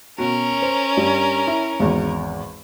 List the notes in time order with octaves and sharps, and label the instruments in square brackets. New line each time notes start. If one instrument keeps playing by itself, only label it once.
[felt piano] B2 F#4 [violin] C#4 A#4
[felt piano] C5
G2
E4
G#1 E2